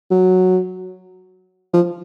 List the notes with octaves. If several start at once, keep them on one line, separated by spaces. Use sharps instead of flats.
F#3
F3